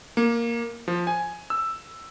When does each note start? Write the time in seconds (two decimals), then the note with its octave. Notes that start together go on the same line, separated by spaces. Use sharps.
0.17 A#3
0.88 F3
1.07 G#5
1.50 E6